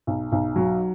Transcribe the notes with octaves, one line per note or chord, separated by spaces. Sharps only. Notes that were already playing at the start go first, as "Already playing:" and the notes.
B1
B1
F#3